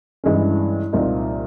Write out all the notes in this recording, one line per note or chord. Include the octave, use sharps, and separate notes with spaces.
G2 E3 G#3 C#4
C2 A#2 F3 A#3 D#4